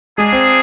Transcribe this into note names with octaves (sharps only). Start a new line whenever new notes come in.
G#3 A#3 D4 G#4
C4